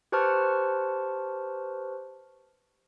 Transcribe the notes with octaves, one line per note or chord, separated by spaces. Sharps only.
G4 B4 C5 A5 C#6 F6